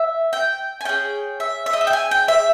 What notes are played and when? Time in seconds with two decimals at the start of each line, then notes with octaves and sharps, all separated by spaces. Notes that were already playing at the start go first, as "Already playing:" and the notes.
Already playing: E5
0.33 G5
0.81 G#5
0.85 C#4 G#4 G5
1.40 E5
1.66 E5
1.73 D#5
1.81 E5
1.87 G5
1.93 G#5
2.11 G5
2.28 E5